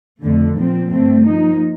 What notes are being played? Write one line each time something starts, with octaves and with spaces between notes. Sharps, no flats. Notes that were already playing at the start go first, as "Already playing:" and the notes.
F2 D3 A3
A#2 F3 C4
G2 D3 A3 C4
F3 A#3 D#4